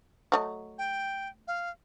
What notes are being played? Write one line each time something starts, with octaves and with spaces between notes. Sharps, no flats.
F#3 A3 D#5
G5
F5